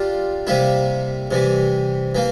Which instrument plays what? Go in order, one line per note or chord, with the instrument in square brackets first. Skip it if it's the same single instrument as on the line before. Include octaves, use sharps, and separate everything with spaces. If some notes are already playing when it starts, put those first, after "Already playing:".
Already playing: [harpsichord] G3 D4 F4
C3 G3 A#3 E4
C3 E3 G3
E3 A#3